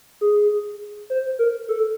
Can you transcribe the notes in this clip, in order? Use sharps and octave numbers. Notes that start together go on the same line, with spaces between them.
G#4
C5
A#4
A4